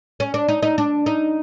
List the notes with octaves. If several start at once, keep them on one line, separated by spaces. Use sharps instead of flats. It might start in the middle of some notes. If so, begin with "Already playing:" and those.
C#4
D4
D#4
D#4
D4
D#4